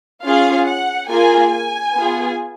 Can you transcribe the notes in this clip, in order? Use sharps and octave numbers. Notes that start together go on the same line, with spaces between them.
C#4 F4 G#4 F5
F#5
A#3 F4 G#4 G#5
G#5
B3 F4 G#4